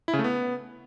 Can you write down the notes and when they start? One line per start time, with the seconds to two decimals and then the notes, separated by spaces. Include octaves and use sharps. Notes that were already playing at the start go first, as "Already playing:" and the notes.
0.08 E4
0.13 C#3
0.19 A3
0.24 B3